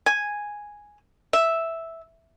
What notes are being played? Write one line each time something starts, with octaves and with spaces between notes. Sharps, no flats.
G#5
E5